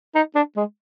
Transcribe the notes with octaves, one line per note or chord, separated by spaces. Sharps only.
D#4
D4
G#3